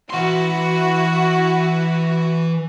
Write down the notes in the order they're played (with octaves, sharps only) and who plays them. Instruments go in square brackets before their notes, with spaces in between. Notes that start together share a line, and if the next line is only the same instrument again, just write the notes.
[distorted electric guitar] E3 C6 [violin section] E4 F#4